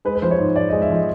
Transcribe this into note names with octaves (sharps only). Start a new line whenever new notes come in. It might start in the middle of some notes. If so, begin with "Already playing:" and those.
G#3 B4
B4
F3 C5
C#5
G#2
G#2 D5
G#3 D#5
E5
F3 D#5